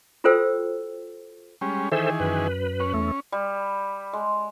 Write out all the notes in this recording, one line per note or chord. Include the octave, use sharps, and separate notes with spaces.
F4 F#4 A4 C5 G5 E6
G3 G#3 C#4
D#3 E3 G#4 A4 C5 E5
F#2 B4
C#4
E2 A3
G3
G#3